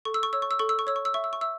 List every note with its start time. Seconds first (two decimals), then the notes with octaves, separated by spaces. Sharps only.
0.05 A4 C#6
0.14 E6
0.23 C#6
0.33 C#5 E6
0.42 C#6
0.51 E6
0.59 A4 C#6
0.69 E6
0.79 C#6
0.87 C#5 E6
0.96 C#6
1.05 E6
1.14 E5 C#6
1.24 E6
1.33 C#6
1.41 E5 E6